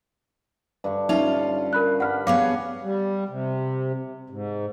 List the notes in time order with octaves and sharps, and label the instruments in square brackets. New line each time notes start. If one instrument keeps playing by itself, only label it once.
[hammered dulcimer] G2 D3 C#6
[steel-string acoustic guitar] C#4 F4 [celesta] D#4 E5 F7
[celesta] A#4 B5 F#6
[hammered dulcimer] G2 B5 [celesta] F#5 F6
[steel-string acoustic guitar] B3 G#4 C#5 [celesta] F5 D6
[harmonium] G3
C3
G#2